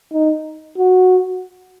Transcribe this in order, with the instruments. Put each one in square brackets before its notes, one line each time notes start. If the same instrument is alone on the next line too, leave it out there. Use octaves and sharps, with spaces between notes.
[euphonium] D#4
F#4